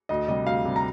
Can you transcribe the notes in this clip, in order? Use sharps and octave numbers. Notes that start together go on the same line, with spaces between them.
D2 D#5
C3 G3 D#5
D2 F5
C3 G3
A#5